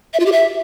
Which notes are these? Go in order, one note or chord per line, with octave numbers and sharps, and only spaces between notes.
E5
F4
G4
E5